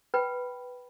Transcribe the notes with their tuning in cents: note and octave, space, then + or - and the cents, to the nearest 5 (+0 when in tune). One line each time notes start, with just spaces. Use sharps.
B4 +0 G5 -15 B5 +0